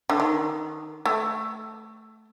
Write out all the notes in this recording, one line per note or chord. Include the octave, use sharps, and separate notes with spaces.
D3
D#3
A3